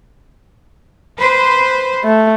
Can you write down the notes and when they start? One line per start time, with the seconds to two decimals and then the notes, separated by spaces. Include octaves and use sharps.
1.19 B4 C5
2.04 A3